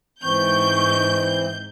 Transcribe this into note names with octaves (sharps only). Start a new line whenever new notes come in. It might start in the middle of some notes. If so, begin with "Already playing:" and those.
G#2 E3 C4 C#6 G6